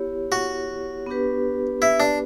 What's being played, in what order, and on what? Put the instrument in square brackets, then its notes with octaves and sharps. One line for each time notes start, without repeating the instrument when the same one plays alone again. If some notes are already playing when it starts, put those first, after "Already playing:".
Already playing: [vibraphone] B3 E4 G4 C#5
[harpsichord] F#4
[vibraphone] B3 D4 G4 B4
[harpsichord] E4
D4